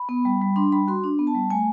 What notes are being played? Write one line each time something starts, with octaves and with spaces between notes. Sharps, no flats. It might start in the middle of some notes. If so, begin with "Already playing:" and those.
Already playing: B5
B3
G3
G3
D4 C6
G3 B5
F#4 C6
D4
B3
A5
G3
A3 G#5